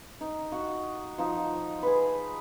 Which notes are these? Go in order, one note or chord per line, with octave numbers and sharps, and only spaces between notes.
D#4
F#4 F#5
F3 D#4
G#4 B4